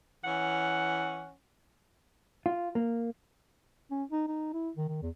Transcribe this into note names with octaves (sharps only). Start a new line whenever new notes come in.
E3 C#4 F#5
F4
A#3
C#4
D#4
D#4
E4
D#3
D#3
E2